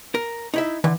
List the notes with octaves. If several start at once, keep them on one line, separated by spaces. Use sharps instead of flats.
A#4
D#4 E4 E5
D3 E3